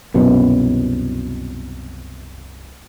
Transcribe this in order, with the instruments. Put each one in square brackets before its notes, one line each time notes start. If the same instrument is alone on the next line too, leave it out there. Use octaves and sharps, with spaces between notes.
[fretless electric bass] C2 F#2 B2